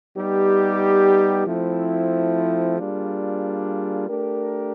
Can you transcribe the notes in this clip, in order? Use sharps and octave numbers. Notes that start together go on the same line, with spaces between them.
G3 B3 D#4 G4
F3 A3 C4 E4
G3 A#3 D4 F4 G#4
A3 D4 G4 A#4